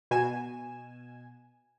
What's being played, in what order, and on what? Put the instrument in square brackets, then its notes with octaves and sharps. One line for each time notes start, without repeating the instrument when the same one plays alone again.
[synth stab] B2 G#5 E7